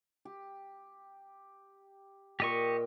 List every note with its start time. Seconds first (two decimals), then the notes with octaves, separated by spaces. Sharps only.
0.25 G4
2.40 A#2 G4 D#5 G5 C#6